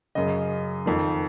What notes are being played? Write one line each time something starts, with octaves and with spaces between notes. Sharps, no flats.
F#2 C#3 D#5
F2 D#3